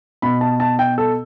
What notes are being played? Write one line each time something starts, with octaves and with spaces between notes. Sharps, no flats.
B2 B5
A5
A5
G5
A4